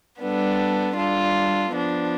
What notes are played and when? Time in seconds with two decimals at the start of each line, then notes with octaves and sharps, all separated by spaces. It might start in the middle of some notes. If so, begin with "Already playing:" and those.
0.20 G3 B3 D4 A4
0.96 G3 D4 F4 A4
1.70 F3 B3 D4